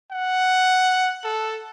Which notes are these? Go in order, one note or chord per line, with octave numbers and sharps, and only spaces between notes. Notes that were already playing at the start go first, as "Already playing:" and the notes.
F#5
A4